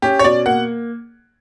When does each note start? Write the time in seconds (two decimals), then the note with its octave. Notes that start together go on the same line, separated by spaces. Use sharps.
0.02 C#4 G4
0.19 C#5
0.24 B2 D5
0.46 A#3 F#5